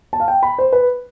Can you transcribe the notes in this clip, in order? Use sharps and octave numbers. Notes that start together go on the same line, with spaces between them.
A5
F5
G5
B5
C5
B4